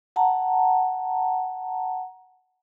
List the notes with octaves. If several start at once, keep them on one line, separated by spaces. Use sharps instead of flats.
F#5 A5 A#5